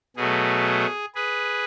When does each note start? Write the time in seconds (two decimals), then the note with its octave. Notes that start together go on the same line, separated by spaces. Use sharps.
0.17 B2 F#3 A3 G#4
1.15 G#4 B4